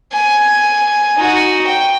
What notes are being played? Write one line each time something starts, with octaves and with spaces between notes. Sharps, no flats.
G#5
D#4 F#4
G5